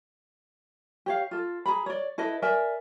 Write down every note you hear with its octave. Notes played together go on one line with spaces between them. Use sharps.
G4 C#5 F5
F4 A4
G#4 A#5 B5
C#5 D5
E4 A4 B4 D#5
A#4 D5 E5 G#5